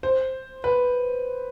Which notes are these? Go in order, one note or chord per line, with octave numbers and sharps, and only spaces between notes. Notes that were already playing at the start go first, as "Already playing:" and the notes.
C5
B4